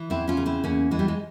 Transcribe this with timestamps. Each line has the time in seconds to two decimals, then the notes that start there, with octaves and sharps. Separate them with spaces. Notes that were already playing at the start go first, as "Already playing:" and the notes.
Already playing: E3
0.10 E2 C4 E4
0.28 C#4 F4
0.37 C#3
0.46 C4 E4
0.64 E2 A#3 C#4
0.91 E3 G#3
0.99 G3
1.08 G#3